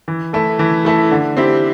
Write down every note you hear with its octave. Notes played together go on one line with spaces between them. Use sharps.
E3
A3 E4 A4
E3
A3 E4 A4
D3
C4 E4 G4